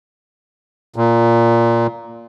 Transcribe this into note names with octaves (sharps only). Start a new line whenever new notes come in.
A#2